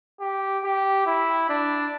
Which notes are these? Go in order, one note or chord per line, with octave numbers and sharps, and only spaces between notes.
G4
G4
E4
D4